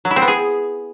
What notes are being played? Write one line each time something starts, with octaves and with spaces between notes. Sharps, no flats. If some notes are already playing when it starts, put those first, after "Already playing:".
F#3
E4
C4
B3
G#4